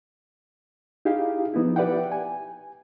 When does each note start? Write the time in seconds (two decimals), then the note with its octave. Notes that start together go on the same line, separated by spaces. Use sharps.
1.05 D#4 E4 G4 G#4 F5
1.54 F3 B3 D#4 E4
1.76 G4 B4 D5 E5 F#5 G5
2.12 G#5